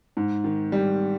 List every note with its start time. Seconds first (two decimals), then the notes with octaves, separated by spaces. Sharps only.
0.17 G#2
0.44 D#3
0.72 G3